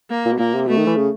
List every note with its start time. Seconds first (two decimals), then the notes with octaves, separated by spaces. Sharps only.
0.10 A#3
0.25 A#2
0.32 B2
0.39 A#2 A#3
0.54 C3
0.68 B2 A3
0.77 D#3
0.87 E3
0.96 C#3